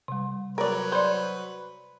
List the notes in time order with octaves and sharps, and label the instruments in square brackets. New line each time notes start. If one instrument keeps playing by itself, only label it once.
[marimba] C3 G3
[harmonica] F#3 B4 C#5 [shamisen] A#4 D5
[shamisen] C5 [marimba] D5 B5 G6